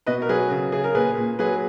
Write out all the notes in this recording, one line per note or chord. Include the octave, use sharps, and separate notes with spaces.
B2 B4 D#5
A#4
F#3 G#4 B4
C#3
C#3 G#4
A#4
A#2 G#4 B4
A#2
F#3 G#4 B4